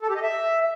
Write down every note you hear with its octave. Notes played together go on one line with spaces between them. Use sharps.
A4
G4
D#5
E5